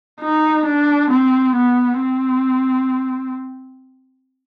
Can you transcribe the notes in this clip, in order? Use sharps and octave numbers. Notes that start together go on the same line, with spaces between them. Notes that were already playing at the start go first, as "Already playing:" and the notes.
D#4
D4
C4
B3
C4